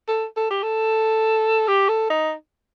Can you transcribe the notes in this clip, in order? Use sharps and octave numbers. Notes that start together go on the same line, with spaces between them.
A4
A4
G4
A4
G4
A4
D#4